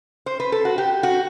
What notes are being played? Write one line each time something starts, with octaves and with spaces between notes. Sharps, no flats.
C5
B4
A4
F#4
G4
F#4